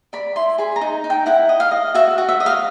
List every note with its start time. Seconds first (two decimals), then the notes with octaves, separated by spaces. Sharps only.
0.13 D5 B5
0.36 E4 C6
0.58 G#4 B5
0.76 A#5
0.81 D#4
1.04 D#4
1.10 G5
1.26 E4 F#5
1.49 D#5
1.60 F5
1.71 D#5
1.94 F#4 E5
2.18 F#4
2.29 E5
2.40 D#5
2.46 F5